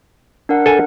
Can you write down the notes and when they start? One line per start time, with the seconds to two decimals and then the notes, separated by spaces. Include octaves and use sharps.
0.49 D4 A#4 F#5
0.66 A4 G#5